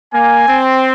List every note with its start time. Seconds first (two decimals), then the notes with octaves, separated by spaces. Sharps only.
0.14 A#3 G#5
0.48 C4